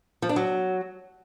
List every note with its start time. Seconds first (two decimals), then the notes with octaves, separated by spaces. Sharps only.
0.22 F3
0.29 D4
0.36 F#3